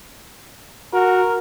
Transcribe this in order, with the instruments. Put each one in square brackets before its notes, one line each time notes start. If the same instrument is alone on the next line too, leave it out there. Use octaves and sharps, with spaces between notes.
[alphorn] F#4 [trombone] A#4